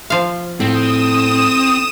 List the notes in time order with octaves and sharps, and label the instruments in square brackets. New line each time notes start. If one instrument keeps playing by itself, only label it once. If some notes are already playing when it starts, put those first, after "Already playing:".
[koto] F3 F5
[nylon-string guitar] A2 [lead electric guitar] C4 [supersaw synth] D#6 E7